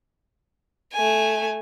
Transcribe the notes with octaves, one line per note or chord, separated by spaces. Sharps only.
A3 G#5